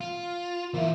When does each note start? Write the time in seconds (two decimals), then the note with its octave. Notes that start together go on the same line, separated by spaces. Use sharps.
0.01 F4
0.74 E3 A#3 E4 F4